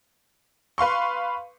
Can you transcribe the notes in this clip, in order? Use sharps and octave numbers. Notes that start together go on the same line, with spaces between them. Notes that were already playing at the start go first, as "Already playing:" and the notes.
B4 F5 C6 C#6